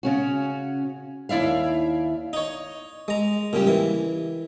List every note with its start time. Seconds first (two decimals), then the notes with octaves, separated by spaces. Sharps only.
0.03 C#3 C#4 F#4
1.29 D#2 E4 D5 E5 F5
2.33 D#4 C#5
3.08 G#3 A#5
3.53 A#2 C#3 G3
3.67 E3